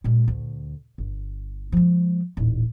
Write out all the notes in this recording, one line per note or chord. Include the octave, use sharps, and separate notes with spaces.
A#2 G#3
D2
G1
F3 G#3
D#1 A1